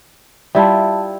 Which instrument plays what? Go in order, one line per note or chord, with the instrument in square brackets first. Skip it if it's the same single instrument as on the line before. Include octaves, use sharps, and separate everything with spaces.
[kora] G3 E4 F4 [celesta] E5 A5